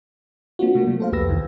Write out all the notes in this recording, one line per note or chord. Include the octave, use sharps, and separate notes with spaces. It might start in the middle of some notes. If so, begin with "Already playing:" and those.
A#3 C4 D4 F4 F#4
C3 A3 A#3
F#3
A4 C5 F5
C2 F2 G4 B4 E6 A#6
E2 D#3 E3